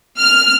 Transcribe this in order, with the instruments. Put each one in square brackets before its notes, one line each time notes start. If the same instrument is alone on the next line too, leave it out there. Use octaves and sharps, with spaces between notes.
[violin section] F6